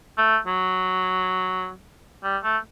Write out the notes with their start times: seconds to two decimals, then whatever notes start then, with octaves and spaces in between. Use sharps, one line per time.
0.18 A3
0.47 F#3
2.23 G3
2.44 A3